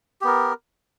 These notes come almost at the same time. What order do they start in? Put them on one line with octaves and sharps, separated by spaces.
G4 B3 A#4